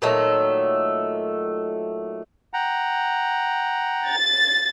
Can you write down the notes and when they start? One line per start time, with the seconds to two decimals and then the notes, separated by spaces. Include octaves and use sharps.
0.02 A#2 D#3 F#3 A3
2.54 F#5 G5 A#5
4.09 A6